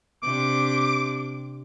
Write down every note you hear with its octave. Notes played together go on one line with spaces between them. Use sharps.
C3 D4 D6